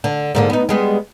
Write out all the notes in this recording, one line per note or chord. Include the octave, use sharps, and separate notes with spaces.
D3
G#2 D3 A#3
B3 D#4
G3 G#3 B3